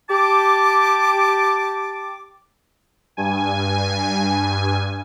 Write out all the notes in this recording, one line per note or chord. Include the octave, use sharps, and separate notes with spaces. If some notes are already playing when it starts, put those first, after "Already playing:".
G4 A5 D6
G2 G#5